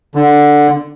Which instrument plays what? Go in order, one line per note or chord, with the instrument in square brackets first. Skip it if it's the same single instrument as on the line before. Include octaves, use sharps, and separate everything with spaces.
[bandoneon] D3